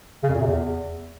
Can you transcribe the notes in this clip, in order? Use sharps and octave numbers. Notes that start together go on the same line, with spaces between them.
C#3
F2
A#2
C3
E2